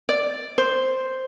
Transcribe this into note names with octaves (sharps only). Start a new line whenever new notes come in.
D5
C5